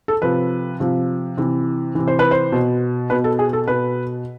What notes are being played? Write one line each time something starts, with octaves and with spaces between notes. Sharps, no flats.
A4
C3 F3 B4
C3 F3
C3 E3
C3 E3
C5
B4
C5
B2
B2 B4
A4
G#4
A4
B2 B4